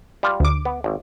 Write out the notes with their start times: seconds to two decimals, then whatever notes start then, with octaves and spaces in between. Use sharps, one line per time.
0.23 G3 F4
0.40 D2 D6
0.65 B3
0.84 G#1